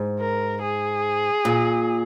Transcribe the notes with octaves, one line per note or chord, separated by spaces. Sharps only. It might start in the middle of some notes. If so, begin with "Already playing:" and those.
Already playing: G#2
A#4
G#4
A#2